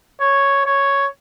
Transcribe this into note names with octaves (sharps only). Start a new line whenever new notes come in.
C#5
C#5